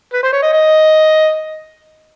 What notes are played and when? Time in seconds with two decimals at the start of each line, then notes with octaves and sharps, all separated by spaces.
0.13 B4
0.23 C5
0.33 C#5
0.42 D#5
0.53 D#5